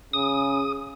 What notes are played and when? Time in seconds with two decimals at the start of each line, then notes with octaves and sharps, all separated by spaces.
0.13 C#3 D#6